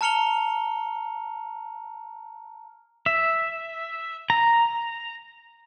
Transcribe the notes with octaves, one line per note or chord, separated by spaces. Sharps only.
A5 A#5 F6 C#7 F7 G7
E5
A#5